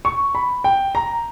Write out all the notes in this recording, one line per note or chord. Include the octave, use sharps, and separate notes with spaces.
C#6
B5
G5
A#5